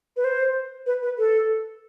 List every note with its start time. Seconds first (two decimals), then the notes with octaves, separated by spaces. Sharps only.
0.17 B4
0.24 C5
0.86 B4
1.03 B4
1.18 A4